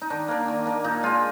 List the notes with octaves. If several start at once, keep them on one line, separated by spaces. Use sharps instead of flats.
D#4
D#3 D4
A#3 D4
D#3
A#3 D4
A#2 D#4
G#3 D4 F4